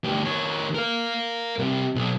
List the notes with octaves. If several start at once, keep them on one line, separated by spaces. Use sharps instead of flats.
D2 G4
D#3 C#5
A#4 F5
C3 G3
B1